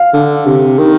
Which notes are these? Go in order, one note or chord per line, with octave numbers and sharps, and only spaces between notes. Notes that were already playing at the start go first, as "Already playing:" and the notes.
Already playing: F5
D3
C3
D#3